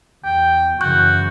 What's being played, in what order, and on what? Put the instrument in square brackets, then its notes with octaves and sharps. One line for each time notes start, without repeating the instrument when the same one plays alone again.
[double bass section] E2 [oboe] G5
[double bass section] F#2 C#3 E3 [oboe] F#4 [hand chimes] C#6 F#6 G6